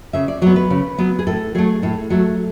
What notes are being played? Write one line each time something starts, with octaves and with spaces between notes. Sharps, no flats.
C#3 E5
D5
F#3 B3 C#5
B4
C#3
F#3 B3
G#4
A2 A4
F#3 A3 G#4
A2 A4
F#3 A3 A4